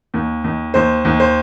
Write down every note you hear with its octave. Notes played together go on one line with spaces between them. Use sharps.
D#2
D#2
D#2 C5
D#2
C5